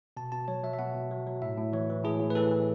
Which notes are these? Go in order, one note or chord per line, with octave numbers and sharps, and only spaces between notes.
B2 A5
B2 A5
F#3 C#5
F#3 E5
E5
B2 F#5
B2
F#3
F#3
A2 E5
A2
E3 C#5
E3
A2 G#4
A2
B4
E3 A4
E3